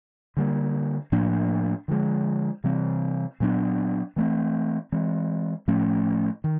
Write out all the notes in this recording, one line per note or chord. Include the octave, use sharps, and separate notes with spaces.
D3 G3 A#3
A2 F3 A#3 D4
D3 F3 G#3
C3 E3 G3 C4
A#2 F#3 B3 D4
E3 A3 C4
E3 G#3 C4
A2 F3 A3 C#4
D#3